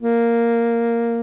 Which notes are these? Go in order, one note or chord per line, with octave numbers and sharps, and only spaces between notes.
A#3